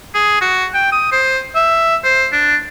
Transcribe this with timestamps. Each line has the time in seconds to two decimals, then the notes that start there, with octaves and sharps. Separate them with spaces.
0.15 G#4
0.41 F#4
0.74 G5
0.92 D#6
1.12 C5
1.56 E5
2.04 C5
2.32 D4